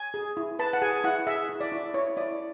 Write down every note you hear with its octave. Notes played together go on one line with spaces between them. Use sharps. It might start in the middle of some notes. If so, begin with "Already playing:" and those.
Already playing: G#5
G#4
E4
B4 A5
F#5
G#4 G#5
E4 F#5
G#4 E5
E4
D5
E4
E4 C#5
E4 D5